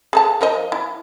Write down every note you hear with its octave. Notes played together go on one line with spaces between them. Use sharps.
G#4 A4 A5
F3 A#4 D#5
E4